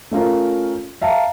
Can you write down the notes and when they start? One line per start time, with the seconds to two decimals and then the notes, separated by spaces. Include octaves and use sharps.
0.11 A3 C#4 F4 A#4
1.01 E5 F5 A5 A#5